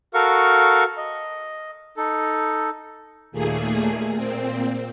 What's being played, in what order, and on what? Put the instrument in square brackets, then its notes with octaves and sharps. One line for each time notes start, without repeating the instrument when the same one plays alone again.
[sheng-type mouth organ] F#4 A4 A#4 F5 C#6
D#5
D#4 A4
[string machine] D#2 A#2 A3 A#3 G#4
A#2 C4